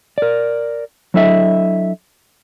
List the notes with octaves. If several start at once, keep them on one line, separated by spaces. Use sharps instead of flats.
A#4 D5
F#3 D4 E4 A4 D#5 E5